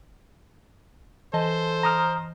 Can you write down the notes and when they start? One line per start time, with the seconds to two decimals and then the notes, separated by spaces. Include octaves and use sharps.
1.34 E3 A4 C5 D#5 A5
1.83 A#5 D#6 F6